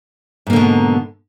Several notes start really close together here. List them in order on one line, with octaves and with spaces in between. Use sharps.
G#2 A#3 D3 B2